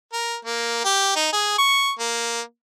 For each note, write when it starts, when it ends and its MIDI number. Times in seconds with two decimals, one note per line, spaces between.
0.13 0.36 70
0.45 0.82 58
0.85 1.13 67
1.16 1.29 63
1.33 1.57 68
1.58 1.91 85
2.00 2.41 58